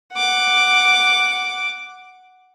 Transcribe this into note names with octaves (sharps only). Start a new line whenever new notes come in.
F#5 D6